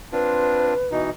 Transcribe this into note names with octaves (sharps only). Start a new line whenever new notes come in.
C4 D4 F4 B4
B2 E3 D#4